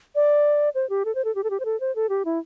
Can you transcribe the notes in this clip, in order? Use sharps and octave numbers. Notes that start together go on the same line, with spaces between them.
D5
C5
G4
A4
C5
A4
G4
A4
G4
C5
A4
C5
A4
G4
E4